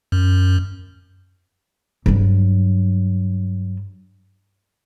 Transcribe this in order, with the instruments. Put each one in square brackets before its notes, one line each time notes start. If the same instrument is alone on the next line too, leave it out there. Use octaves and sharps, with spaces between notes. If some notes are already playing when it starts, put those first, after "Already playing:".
[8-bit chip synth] F#2
[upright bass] G2 F#3